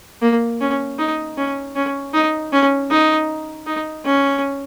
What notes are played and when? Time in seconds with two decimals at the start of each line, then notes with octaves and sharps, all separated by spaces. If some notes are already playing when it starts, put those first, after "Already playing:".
0.22 A#3
0.61 C#4
0.99 D#4
1.38 C#4
1.76 C#4
2.14 D#4
2.53 C#4
2.91 D#4
3.67 D#4
4.05 C#4